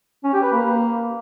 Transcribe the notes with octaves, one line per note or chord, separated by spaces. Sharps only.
C#4
G4
B4
A#3